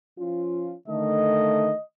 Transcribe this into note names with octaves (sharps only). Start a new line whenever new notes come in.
F3 C#4 F4
D3 D#3 A3 D#5